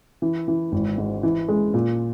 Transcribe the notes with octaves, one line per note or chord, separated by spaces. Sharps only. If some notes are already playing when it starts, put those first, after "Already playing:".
E3
E3
G#1
G#2
E3
G#3
A#2